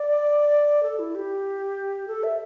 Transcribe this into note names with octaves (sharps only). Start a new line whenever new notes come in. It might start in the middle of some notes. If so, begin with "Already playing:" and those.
Already playing: D5
A4
E4
G4
A4
E5